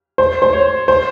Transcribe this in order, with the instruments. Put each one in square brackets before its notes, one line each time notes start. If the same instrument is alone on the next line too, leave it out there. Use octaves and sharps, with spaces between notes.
[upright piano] C5
C5
C#5
C5